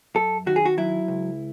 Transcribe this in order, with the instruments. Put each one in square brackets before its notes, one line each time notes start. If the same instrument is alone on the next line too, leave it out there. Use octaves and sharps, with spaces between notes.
[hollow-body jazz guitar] F#2 A4
D#3 F#4
G#4
F#4
F#3 E4
C#2